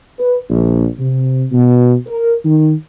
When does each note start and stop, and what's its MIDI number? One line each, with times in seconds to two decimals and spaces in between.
0.19 0.38 71
0.50 0.87 34
0.99 1.44 48
1.52 1.95 47
2.06 2.34 70
2.44 2.72 51